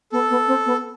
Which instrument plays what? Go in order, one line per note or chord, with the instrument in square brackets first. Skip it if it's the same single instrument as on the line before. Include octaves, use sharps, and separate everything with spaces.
[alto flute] B3 [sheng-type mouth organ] A4
[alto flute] B3
C4
B3